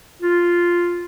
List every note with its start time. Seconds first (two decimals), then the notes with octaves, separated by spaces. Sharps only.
0.22 F4